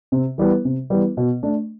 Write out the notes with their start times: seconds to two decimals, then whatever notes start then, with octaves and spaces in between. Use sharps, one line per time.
0.12 C3
0.38 E3 G3 B3
0.65 C3
0.90 E3 G3 B3
1.17 B2
1.43 A3 D4